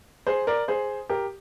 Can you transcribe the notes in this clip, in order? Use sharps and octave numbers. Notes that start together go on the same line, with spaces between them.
G#4 C5
A#4 D5
G#4 C5
G4 A#4